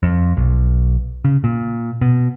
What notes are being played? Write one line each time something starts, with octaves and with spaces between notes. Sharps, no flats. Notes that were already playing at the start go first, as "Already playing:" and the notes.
F2
B1
C#3
A#2
B2